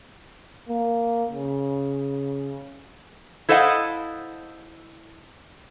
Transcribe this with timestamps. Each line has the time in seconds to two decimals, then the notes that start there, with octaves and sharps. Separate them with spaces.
0.69 A#3
1.30 C#3
3.49 E4 A4 C5 D#5 F5 F#5